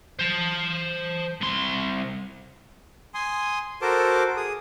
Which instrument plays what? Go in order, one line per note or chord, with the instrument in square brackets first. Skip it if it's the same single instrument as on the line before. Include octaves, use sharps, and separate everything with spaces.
[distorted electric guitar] C5 A5
C2 C6
[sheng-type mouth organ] G#5 C6 D#6
F#4 A4 A#4 C5 A5 D6
G#4 D#6